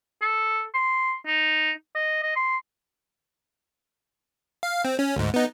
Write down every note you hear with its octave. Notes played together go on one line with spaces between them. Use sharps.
A4
C6
D#4
D#5
D#5
C6
F5
C4
C#4
D2 G#2
B3 D#4